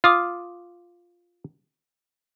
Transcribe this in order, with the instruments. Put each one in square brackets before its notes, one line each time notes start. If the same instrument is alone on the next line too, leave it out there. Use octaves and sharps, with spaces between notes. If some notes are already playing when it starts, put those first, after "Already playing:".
[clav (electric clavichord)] F4 [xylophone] D6 D#6 F6